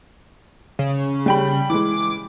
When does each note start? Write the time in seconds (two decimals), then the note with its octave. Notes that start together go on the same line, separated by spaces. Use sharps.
0.79 C#3
1.26 G3 G5 B5
1.70 E3 G#3 D6